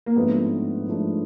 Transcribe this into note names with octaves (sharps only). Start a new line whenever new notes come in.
A#3
A1 G#2 F3 A3 B3 D4
A1 G#2 F3 A3 D4